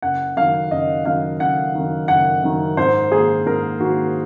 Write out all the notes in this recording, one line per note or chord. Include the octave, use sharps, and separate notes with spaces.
F#1 F#5
F#2 D#3 F5
F#1 D#5
F#2 D#3 F5
F#1 F#5
F#2 D#3
F#1 F#5
F#2 D#3
G#2 C5
D#3 A#3 G#4
G#2 A#4
D#3 F#4
A#3